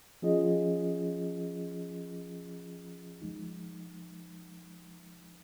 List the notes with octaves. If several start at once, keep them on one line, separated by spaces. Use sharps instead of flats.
F3 C#4 F4 G#4 D#5
F3 G#3 D#4